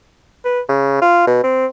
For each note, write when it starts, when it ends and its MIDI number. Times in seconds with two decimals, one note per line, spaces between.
0.45 0.60 71
0.69 1.01 49
1.02 1.24 65
1.27 1.40 47
1.44 1.66 60